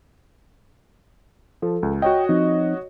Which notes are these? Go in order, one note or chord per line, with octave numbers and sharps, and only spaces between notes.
F3 A4
C#2
F#4 C#5 D#5 G5
F3 C4 D#4